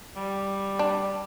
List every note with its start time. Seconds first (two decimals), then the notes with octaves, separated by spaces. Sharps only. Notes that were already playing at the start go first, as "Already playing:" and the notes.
0.17 G3
0.79 D4